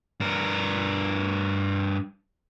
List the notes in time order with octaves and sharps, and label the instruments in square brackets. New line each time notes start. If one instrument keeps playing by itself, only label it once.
[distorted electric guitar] G2 A#4